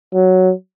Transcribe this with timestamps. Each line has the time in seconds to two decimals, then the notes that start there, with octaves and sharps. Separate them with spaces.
0.14 F#3